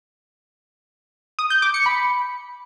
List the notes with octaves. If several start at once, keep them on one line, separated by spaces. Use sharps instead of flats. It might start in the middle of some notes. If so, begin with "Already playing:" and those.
D#6
G6
D6
C#7
B5